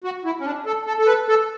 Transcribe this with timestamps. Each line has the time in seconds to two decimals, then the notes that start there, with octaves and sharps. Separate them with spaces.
0.04 F#4
0.25 E4
0.40 C#4
0.45 D4
0.66 A4
0.87 A4
0.99 A4
1.07 B4
1.28 A4